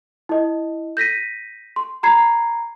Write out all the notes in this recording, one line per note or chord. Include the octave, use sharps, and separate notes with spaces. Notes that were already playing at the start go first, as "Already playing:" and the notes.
E4 D#5
G6 A#6 B6 D#7
C6
A#5 B5 G#6 C7